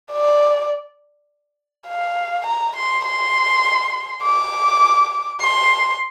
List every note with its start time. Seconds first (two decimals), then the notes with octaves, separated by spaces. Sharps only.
0.12 D5
1.88 F5
2.46 A#5
2.76 C6
3.05 C6
4.23 D6
5.41 C6